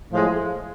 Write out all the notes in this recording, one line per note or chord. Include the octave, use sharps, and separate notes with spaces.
A2 F3 G#3